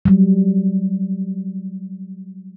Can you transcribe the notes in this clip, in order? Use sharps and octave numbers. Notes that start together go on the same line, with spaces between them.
F#3 G3